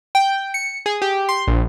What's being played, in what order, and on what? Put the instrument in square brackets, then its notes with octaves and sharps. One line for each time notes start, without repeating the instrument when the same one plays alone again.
[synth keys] G5
C#7
G#4
G4
C6
A#1